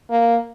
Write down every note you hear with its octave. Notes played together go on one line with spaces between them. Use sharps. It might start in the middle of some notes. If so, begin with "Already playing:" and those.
A#3